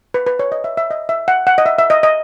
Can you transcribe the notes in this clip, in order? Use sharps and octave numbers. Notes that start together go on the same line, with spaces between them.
B4
B4
C#5
D#5
E5
E5
D#5
E5
F#5
F#5
D#5
E5
E5
D#5
D#5